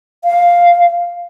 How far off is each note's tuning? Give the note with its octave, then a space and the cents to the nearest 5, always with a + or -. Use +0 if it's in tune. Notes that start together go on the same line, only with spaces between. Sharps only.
F5 +0